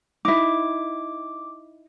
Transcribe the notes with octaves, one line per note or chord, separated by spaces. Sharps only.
D#4 E4 D6